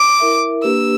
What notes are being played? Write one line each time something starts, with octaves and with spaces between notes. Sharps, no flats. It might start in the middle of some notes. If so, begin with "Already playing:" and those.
Already playing: D6
E4 A#4 E5
A#3 D4 G4 B4 E6